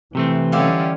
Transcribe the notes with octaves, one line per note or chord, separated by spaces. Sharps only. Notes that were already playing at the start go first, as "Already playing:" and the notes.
C3 E3 A3 C4
D3 G3 C#4 G4 E5 F5